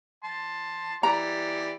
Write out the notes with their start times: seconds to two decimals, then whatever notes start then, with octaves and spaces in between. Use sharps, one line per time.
0.24 A5 C6
1.03 E3 G4 D5 A#5